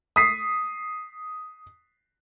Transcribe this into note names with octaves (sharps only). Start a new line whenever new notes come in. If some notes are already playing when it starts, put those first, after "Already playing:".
D#6 B6 C7